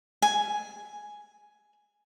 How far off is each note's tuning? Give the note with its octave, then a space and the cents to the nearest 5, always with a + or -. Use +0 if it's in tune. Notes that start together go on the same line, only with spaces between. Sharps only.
G#5 +5